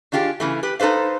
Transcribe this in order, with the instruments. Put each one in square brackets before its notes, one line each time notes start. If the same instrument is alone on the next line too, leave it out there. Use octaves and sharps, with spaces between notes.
[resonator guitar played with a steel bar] D#3 D4 F4 G4 G#4
C#3 E3 A3
G4 B4
D#4 A4 B4 C5 F5